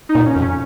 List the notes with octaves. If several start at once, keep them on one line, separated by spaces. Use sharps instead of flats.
D#4
A#2
C#4
F2
C#4